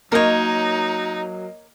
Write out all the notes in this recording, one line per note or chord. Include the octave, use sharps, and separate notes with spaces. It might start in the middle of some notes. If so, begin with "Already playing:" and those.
F#3 A#3 D#4 A#4 C#5 D#5